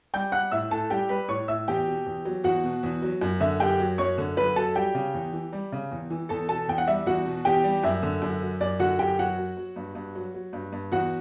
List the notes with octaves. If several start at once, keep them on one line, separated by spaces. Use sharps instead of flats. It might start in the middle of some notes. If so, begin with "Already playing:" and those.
G3 G5 G6
G3 F#5 F#6
A2 E5 E6
A2 A4 A5
G3 G4 G5
G3 B4 B5
A2 C#5 C#6
A2 E5 E6
E2 G4 G5
B2
E2
F#3
E2 F#4 F#5
B2
E2
F#3
F#2
D3 E5
F#2 G4 G5
F#3
F#2 C#5 C#6
D3
F#2 B4 B5
F#3 A4 A5
G3 G4 G5
C#3
E2
E3
G3
C#3
E2
E3
E2 A4 A5
B2 A4 A5
E2 G5
F#5
G3 E5
E2 F#4 F#5
B2
E2 G4 G5
G3
F#2 E5
D3
F#2
F#3
F#2 D5
D3 F#4 F#5
F#2 G4 G5
F#3 F#4 F#5
F#3
F#3
G2
G2
F#3
F#3
G2
G2
E2 F#4 F#5